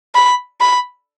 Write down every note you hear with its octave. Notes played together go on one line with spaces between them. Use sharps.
B5
B5